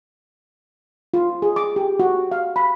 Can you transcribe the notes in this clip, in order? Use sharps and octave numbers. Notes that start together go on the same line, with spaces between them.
F4
G#4
D6
G4
F#4
F5
B5